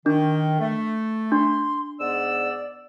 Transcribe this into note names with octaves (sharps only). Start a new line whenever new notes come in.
D#3 D4
A3
D4 C6
G#2 B3 D5 E6